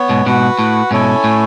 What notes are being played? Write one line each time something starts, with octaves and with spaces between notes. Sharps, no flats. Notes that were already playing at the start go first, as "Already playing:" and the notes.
Already playing: B3 C#5
G#2 B2
G#2 B2 F#4 B4 F#5
A2
G#2 B2 C#4 E4 A4 C#5 G#5
A2